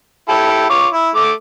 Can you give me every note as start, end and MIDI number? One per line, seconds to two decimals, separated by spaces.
0.29 0.66 64
0.29 0.66 67
0.29 0.66 69
0.70 0.87 65
0.70 0.87 73
0.70 0.87 86
0.93 1.09 64
1.15 1.31 57
1.15 1.31 86